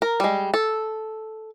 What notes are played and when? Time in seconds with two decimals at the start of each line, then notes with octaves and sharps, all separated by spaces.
0.02 A#4
0.20 G3 G#3
0.54 A4